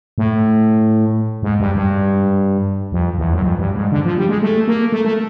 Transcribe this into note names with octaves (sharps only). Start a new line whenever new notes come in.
A2
G#2
G2
G2
F2
E2
F#2
F2
G2
G#2
D3
F3
G3
G#3
A3
A#3
A3
A3